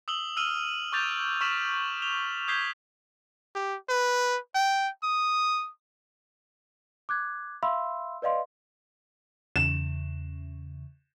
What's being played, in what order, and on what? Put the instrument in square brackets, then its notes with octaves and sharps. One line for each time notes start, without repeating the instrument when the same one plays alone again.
[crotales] D#6 E6 F#7 G7
E6 F6 D#7 F#7 G7
C#6 D6 G6 A6 F7
C#6 F6 B6 E7 F#7
F7 G7
D#6 G6 G#6 B6 C7 G7
[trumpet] G4
B4
G5
D#6
[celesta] D6 F#6 G#6
E5 F5 B5 C6 E6
B4 D5 D#5 F5 C6
[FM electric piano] E2 C#3 [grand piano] E7